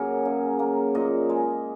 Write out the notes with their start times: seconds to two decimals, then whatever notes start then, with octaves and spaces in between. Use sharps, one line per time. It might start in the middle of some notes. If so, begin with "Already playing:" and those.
Already playing: F#2 F#3 A#3 G#4 A#4
0.25 C#3
0.59 A#3
0.95 A#2 D#5
1.29 G#3